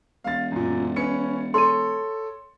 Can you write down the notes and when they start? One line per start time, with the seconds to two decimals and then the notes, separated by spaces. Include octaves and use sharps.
0.24 E1 F5 A6
0.52 F#2 A#2
0.96 C#4 B4 C#7
1.54 A4 C#5 C6 D#7